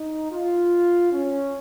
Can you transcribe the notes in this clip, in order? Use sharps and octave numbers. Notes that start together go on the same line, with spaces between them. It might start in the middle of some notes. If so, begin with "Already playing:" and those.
Already playing: D#4
F4
C#4